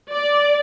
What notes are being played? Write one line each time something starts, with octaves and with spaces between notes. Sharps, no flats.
D5